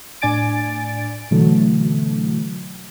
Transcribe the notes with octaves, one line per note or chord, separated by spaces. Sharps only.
A2 D4 D5 G#5 A6 D7
B2 D3 E3 F#3 A3